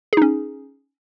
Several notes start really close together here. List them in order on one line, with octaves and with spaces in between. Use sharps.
G#4 D#4 C#4